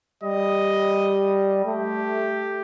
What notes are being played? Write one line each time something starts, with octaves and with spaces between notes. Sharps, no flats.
G3 D#5
A3 G4